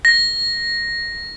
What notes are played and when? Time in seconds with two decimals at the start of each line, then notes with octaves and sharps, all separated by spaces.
0.05 A#6